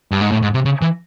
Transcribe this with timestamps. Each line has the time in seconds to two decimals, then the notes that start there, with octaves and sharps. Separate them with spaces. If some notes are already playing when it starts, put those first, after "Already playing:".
0.12 G2
0.21 G#2
0.32 A2
0.42 G#2
0.54 C3
0.65 C#3
0.82 E3